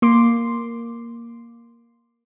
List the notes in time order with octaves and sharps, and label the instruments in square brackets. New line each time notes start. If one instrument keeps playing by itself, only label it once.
[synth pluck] A#3 C6 D6